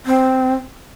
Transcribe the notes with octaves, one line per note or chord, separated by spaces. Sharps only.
C4